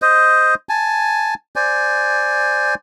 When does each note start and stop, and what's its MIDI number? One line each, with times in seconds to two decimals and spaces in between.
0.02 0.55 72
0.02 0.55 75
0.69 1.34 80
0.69 1.34 81
1.56 2.75 72
1.56 2.75 74
1.56 2.75 80